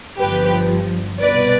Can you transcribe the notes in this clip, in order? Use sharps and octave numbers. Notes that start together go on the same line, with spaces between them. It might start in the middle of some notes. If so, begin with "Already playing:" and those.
G1 G2 F3 G4 B4
C2 B2 B4 D5